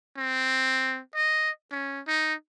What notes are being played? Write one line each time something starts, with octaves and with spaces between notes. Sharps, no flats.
C4
D#5
C#4
D#4